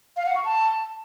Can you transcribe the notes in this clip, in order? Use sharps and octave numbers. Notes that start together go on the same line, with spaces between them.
F5
F#5
C#6
A5